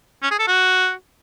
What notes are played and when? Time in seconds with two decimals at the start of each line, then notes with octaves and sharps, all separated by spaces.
0.22 C#4
0.31 G#4
0.39 A4
0.47 F#4